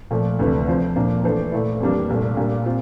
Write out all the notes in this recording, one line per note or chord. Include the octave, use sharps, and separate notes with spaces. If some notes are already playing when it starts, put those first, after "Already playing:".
A#2 F3 A3
D2 C3 E3 A3
F3 C4 F4 C5
A#2 F3 A#3 D4
E3 A3 D4 A4 C5
A#2 A3 E4
F2 E3 G3 A#3 D4
C2 A#2 A3
A#2 G3 A#3 D4
A#2 C4 F4